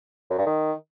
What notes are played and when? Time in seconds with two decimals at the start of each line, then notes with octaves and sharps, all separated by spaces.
0.30 F#2
0.38 G2
0.46 D#3